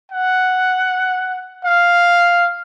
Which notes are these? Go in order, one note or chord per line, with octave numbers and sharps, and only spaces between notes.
F#5
F5